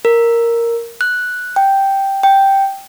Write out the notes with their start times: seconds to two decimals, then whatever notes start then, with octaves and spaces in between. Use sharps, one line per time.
0.05 A#4
1.01 F#6
1.56 G5
2.23 G5